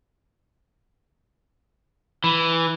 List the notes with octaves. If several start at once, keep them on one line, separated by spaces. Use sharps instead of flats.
E3